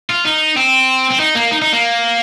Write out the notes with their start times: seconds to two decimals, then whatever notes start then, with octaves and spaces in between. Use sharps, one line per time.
0.10 F4
0.25 D#4
0.56 C4
1.11 C4
1.20 D#4
1.35 A#3
1.51 D#4
1.62 D#4
1.73 A#3